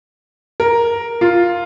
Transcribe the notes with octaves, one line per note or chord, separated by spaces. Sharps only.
A#4
F4